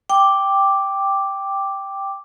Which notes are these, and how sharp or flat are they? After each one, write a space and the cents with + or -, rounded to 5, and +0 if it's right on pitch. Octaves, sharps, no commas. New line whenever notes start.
G5 +0 D6 +0